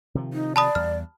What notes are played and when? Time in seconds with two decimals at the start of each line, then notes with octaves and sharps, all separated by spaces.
0.15 C3 D#3 F3
0.33 D#4
0.56 D5 A5 B5 D#6
0.75 E2 G3 F6